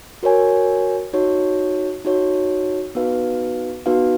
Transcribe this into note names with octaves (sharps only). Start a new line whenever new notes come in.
F#4 A#4 C#5 G#5
D#4 F#4 C#5
D#4 F#4 C#5
B3 D#4 F#4 B4 F5
B3 D#4 F#4 B4 F5